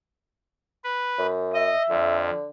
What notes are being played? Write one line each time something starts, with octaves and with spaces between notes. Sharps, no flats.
B4
F#2
D#5 E5
F2 D3